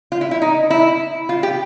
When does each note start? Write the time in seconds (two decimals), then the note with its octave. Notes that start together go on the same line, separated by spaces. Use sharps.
0.12 F4
0.21 E4
0.31 E4
0.42 D#4
0.70 E4
1.29 F4
1.43 G4